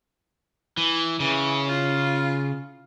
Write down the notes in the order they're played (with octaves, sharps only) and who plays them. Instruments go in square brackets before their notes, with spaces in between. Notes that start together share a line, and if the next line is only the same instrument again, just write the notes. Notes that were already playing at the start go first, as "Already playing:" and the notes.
[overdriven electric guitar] E3
[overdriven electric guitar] C#3 [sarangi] E3
[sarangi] F4